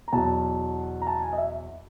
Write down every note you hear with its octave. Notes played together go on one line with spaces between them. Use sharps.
A#5
E2 B2 F#3 A5
A#5
A5
G#5
D#5
E5